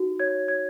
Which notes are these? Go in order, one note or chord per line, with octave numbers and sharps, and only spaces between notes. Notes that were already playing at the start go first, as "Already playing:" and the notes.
Already playing: D#4 F#4
C#5 G#6
C#5 G#6